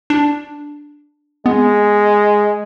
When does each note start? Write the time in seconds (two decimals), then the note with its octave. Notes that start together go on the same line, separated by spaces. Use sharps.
0.10 D4
1.46 G#3 B3